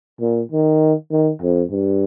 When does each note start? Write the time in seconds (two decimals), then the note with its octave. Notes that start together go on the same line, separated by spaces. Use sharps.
0.21 A#2
0.51 D#3
1.11 D#3
1.42 F2
1.71 G2